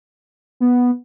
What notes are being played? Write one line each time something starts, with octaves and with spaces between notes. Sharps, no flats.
B3